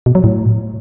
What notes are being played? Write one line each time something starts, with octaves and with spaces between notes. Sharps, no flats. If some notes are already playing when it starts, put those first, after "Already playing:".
B2
F#3
A2